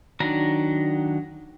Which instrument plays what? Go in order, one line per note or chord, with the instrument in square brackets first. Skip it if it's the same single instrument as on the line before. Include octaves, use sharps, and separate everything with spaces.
[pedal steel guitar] D#3 F#3 D4 A#5